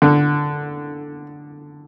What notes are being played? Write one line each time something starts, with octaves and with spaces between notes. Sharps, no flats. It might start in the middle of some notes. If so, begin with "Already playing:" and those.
D3